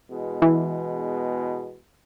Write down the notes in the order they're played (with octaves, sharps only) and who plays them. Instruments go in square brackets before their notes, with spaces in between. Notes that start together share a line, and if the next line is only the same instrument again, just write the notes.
[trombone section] E2 B2 G#3
[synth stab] E3